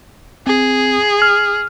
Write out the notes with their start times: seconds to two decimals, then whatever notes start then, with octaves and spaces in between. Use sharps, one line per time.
0.47 C4 G#4
1.22 F6